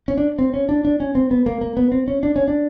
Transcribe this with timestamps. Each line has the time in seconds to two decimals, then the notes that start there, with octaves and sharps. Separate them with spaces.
0.08 C#4
0.18 D4
0.39 C4
0.54 C#4
0.69 D4
0.85 D4
1.00 C#4
1.15 C4
1.31 B3
1.46 A#3
1.61 A#3
1.77 B3
1.92 C4
2.08 C#4
2.23 D4
2.36 C#4
2.48 D4